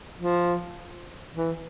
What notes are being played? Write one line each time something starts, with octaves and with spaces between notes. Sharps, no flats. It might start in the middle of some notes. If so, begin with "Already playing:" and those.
F3
E3